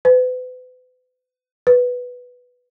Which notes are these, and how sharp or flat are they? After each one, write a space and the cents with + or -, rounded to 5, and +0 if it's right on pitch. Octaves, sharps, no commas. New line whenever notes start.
B4 +40
B4 +0